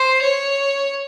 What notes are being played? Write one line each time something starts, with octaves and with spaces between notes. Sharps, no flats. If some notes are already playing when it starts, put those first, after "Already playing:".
Already playing: C5
C#5